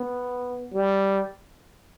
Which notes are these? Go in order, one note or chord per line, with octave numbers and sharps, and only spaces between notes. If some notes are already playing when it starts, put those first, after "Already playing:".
Already playing: B3
G3